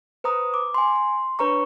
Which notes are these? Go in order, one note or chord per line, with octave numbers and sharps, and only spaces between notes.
B4 C5 A#5 D#6
D6
G#5 C6
C6
D4 B4 C#5 A#5 C#6